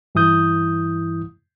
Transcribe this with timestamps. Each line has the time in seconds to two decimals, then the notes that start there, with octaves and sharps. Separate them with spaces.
0.15 G2 E3 E4 D#6 G6